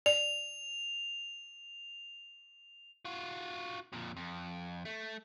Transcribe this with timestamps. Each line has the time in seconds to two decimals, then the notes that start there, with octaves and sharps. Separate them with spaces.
0.06 D5 F7
3.05 F4 F#4
3.93 F2 A#2
4.16 F2
4.85 A3